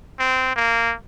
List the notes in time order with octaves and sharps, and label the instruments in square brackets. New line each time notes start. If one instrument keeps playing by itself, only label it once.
[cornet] C4
A#3